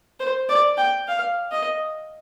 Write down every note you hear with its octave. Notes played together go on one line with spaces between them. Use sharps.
C5
D5
G5
F5
D#5